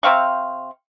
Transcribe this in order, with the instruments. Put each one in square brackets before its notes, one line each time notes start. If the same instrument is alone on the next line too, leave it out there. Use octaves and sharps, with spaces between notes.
[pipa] C3 C4 F5 C#6